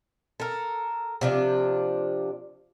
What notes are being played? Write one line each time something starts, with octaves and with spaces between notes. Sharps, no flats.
A4 A#4
C3 F3 D4